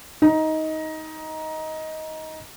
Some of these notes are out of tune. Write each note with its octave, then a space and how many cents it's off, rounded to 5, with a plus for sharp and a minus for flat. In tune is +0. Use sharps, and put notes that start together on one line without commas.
D#4 +15